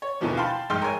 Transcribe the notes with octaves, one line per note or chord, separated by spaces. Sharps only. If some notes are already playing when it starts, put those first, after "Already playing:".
C#5
D#2 B2 D3 E3 F3 A#3
F5 G5 A5 B5 C6
A#1 G#2 G5 C6 F6
A#4 C#5 G#5